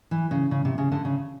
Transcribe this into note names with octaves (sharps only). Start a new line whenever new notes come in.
E3
C#3
C#3
C3
C#3
D3
C#3